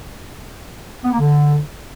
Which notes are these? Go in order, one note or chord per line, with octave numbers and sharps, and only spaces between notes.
B3
A#3
D3